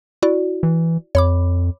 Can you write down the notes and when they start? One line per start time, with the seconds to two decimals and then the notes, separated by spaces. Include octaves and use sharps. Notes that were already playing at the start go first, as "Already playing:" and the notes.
0.22 E4 F#4 D5
0.63 E3
1.15 F2 C#5 B5 D6